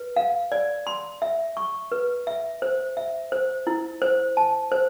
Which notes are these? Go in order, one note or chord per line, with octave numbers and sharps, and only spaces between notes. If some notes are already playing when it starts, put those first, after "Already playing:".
Already playing: B4
F5
D5
C6
E5
C#6
B4
E5
C5
E5
C5
E4
C5
A5
C5